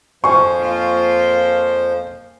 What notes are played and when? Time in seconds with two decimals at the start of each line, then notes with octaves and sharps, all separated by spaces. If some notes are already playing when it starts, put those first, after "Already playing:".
0.24 F2 F3 C5 F5 G#5 C#6
0.58 A#3 F4